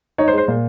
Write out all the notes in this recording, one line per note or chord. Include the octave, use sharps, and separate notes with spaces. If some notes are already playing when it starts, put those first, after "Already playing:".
D#4 C#5
C5
G#3
C5
A#2